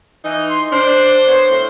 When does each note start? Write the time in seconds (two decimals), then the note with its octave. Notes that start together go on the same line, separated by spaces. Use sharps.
0.24 E3 D#4
0.50 C6
0.71 D4 C5
1.28 B3 C#5
1.51 A2